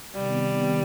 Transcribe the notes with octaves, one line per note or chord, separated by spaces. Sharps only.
C3 D#3 G3 B3